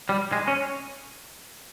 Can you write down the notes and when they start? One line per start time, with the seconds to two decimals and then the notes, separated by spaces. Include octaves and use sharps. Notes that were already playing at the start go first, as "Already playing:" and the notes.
0.09 G3
0.32 G#3
0.48 C#4